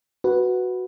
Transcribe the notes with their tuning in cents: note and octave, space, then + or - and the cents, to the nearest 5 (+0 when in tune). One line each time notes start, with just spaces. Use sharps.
F#4 +0 B4 +0